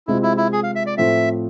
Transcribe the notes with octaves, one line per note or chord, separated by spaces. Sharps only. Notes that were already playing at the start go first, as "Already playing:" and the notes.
C3 G#3 C4 E4 F4
E4
E4
G#4
F5
E5
D5
A2 F3 A3 C4 E5